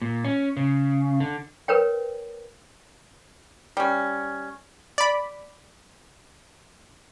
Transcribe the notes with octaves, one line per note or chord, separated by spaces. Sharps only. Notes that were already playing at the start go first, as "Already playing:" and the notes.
A#2
C#4
C#3
D3
A#4 B4 C#5 G5
G3 C#4
D5 B5